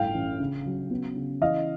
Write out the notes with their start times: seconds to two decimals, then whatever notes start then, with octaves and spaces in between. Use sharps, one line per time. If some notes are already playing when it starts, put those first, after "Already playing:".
Already playing: G1 A2 F5 G5
0.14 A1
0.40 C#3
0.66 F#3
0.91 B3
1.16 C#3
1.41 E3 D#5 F5